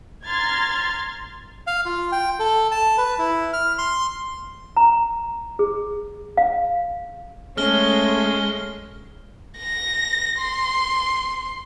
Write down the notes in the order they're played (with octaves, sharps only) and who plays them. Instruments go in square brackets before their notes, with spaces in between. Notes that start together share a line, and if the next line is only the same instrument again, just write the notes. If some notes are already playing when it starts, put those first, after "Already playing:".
[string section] A#5 C6 F6 G#6 A6
[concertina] F5
F4
G5
A4
A5
B4
E4
F6
C6
[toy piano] A#5
G#4
F5
[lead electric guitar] G#3 [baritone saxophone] A3 [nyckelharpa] C#4 [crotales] F6 G7
[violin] A#6
C6